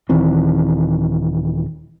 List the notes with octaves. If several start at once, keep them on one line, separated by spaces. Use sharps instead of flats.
D#1 D#3 E3 C4